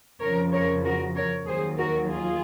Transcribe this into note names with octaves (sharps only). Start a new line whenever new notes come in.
F2 C#3 F3 A#4 C#5
A#4 C#5
F#4 A#4
A#4 C#5
D#2 D#3 F#3 G#4 C5
F#4 A#4
F4 G#4